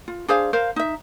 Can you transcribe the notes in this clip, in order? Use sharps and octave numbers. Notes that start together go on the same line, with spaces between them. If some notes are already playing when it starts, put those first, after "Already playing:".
F4
D4 G#4 C5 F5
A#4 C5 F5
D#4 E5